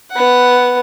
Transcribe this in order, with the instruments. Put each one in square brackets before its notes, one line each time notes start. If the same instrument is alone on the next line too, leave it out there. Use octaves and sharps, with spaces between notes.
[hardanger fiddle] B3 F#5